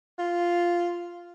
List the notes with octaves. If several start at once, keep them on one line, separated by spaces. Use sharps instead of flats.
F4